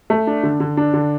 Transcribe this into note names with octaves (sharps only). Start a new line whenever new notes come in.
A3
D4
D3
D3
D4
D3